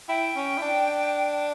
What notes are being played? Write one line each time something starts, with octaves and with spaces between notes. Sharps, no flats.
E4 G5
C#4
E4
D4